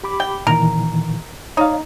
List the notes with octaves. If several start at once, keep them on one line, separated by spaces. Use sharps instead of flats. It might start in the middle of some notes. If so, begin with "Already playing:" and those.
G4 B5 D6
G5
A#2 D#3 E3 A#4
D#4 C#5 D5 F5